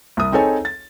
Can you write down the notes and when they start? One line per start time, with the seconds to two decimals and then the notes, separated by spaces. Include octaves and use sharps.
0.17 C2 D#6
0.32 C4 D#4 G#4 A4 C#5 G#5
0.65 A6